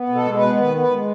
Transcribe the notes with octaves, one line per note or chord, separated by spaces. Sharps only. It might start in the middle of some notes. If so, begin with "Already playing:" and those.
Already playing: B3
B2
A4
G#3
B4
B3
D#3 B4
B3
B4
G#3